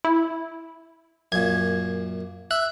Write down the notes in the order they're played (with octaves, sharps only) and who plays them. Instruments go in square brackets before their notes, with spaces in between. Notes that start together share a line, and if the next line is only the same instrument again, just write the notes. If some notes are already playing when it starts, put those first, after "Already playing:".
[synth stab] E4
[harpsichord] F#2 A#2 [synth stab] G#6
[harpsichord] E5 [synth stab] F#6